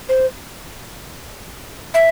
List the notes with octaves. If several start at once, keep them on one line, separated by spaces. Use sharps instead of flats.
C5
E5